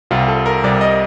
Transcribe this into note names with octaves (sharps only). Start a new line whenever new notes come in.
C2 C3 G3 F4
A4
A#4
C2 C3 G3 D5
D#5